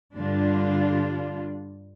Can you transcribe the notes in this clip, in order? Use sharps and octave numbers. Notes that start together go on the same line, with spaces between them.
G2 D3 G3 D4 F4